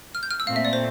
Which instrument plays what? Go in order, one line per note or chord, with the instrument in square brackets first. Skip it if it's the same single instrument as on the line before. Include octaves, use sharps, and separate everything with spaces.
[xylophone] F6
G6
F6
E6
[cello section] A#2 A3 C4 [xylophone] F5
[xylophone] E5
D5
C5